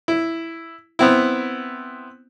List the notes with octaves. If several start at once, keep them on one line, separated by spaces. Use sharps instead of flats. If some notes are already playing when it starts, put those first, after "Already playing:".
E4
B3 C4 E4